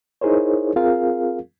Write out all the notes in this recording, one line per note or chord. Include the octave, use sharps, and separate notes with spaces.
D#4 E4 G#4 A#4 C5 C#5
C4 F4 G#4 A#4 F5